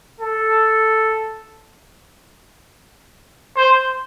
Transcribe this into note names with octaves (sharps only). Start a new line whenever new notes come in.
A4
C5